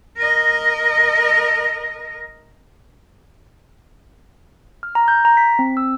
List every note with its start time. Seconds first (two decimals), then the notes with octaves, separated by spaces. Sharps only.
0.18 A#4 D#5
4.83 F6
4.95 A#5
5.08 G6
5.25 A#5
5.37 B6
5.59 C4
5.77 E6